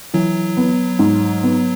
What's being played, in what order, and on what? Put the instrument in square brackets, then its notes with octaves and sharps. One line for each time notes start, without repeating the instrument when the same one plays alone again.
[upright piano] E3 [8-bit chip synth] F#3
[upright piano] B3
G#2
B3